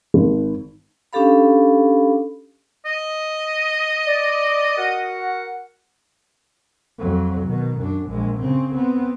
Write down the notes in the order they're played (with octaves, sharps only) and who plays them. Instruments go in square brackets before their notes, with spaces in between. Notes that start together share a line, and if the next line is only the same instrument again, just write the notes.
[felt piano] G#1
[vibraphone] C#4 D4 G4 A4 F5 B5
[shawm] D#5
[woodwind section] D5
F#4 A#4 F#5
[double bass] F2 F#3
B2 D#3
F#2 D4
A#1 G#3
C#3 C4
B3 C4